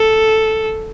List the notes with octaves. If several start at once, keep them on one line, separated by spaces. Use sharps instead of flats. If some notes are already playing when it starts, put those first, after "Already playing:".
Already playing: A4